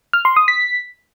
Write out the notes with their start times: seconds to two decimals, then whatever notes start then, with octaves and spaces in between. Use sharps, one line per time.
0.13 F6
0.25 C6
0.36 D#6
0.48 B6